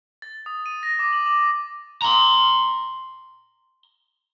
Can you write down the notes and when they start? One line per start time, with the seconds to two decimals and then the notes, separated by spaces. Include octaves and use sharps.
0.22 A6
0.46 D#6
0.66 D#7
0.83 A#6
0.99 D6
1.13 F#7
1.26 D6
2.02 A#5 C6